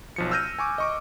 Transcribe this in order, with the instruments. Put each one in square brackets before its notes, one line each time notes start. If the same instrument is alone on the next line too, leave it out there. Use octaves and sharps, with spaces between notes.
[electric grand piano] B1 F3 C#7
E6 F6 G6 A#6 D#7
G#5 C#6 D6
D#5 C#6 D6